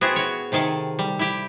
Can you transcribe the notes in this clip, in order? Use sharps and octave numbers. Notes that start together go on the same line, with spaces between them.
B3 C4 E4 F#4 G#4
F#4 C#5
C3 D#3 G#4 A4 A5
G3
E4 G4